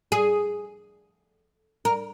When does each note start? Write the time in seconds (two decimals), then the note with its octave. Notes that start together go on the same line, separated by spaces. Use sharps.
0.12 G#4
1.85 A#4